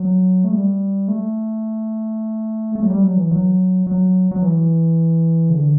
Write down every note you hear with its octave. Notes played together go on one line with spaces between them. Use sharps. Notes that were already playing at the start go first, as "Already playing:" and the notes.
Already playing: F#3
A3
G3
A3
A3
F#3
G3
F#3
E3
F#3
F#3
F#3
E3
C#3
D3